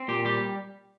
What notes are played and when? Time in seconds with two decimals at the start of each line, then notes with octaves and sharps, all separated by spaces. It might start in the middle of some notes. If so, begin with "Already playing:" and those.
Already playing: C4
0.08 A#2 G4
0.25 G3 G4